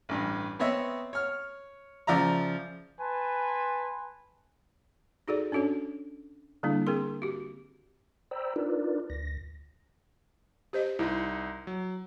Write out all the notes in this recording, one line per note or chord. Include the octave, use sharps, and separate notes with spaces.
A1 G2
B3 C4 C#5 D#5 E5
C#5 F6
C#3 F3 D5 E5 A#5
B4 G#5 A5 C6
D#4 F#4 G#4 A4 D5
C#4 D4 F#4 A4 C#5
D3 G3 A#3 D4 E4
C4 G#4 A#4 C6
F#4 G4
C5 D5 G5 A#5 B5 E6
D4 D#4 F4 A#4 B4 D5
D2 A#6
G4 C5 D#5
C2 D#4 E4
F#3